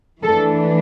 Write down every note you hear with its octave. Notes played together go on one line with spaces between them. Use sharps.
E3 A3 D4 A4